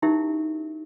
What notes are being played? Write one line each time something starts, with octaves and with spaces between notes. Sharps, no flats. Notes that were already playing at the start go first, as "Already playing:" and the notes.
C#4 D#4 E4 G4 A#4 E5